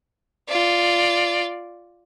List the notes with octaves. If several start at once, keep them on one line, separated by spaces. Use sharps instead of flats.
F4 D5